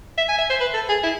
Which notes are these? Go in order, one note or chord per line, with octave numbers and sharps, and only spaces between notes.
E5
G#5
E5
C5
B4
A4
G#4
E4